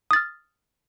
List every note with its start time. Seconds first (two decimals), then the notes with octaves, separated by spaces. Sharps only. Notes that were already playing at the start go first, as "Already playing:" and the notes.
0.11 D#6
0.13 A6
0.16 F6